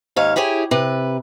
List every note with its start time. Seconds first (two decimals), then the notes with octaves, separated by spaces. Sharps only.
0.16 D#2 G#2 C#5 F5
0.36 E4 G4 G#4 C#5
0.71 C3 B4